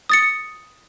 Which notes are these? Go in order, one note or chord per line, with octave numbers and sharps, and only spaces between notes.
D#6 A6 C#7